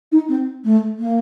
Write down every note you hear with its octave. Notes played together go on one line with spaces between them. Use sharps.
D#4
C4
A3
A#3